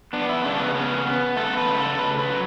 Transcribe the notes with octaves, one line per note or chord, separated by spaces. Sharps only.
B3 D4
E4
C#3 D4
B3
B3 C#4
B3
A3 A4
B4
C#3
A4
C#3 B4
B4
F#3